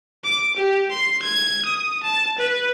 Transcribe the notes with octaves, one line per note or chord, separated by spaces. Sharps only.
D6
G4
C6
G#6
D#6
A5
B4